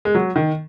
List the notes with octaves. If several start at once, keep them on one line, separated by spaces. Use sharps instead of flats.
G#3
F#3
D#3